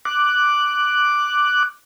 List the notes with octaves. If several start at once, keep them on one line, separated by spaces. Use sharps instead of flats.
D6 F#6